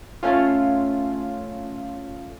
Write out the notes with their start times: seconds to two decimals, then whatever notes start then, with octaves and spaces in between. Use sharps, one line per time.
0.23 A3 C#4 F4